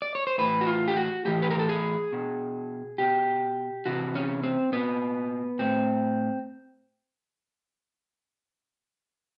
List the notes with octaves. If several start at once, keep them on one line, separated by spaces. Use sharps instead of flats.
D5
C#5
C5
A2 E3 B4
F#4
F4
G4
F#4
A2 E3 G4
B4
A#4
A4
G#4
B2
B2 G4
C3 E3 F#4
C#4
C4
A#2 B3
A2 C4